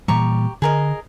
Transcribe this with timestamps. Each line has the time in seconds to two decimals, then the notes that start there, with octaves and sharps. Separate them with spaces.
0.08 A#2 E3 G3 G4 A#5 C#6
0.62 D3 G#4 A#4 D#5